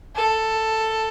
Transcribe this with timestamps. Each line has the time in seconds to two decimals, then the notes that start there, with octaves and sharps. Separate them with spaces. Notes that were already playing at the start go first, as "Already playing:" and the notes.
0.16 A4